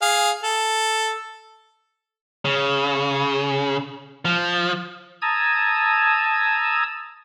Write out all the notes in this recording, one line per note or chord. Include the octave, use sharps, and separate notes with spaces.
G#4 F5
A4
C#3
F3
A5 A#5 D#6 E6 G#6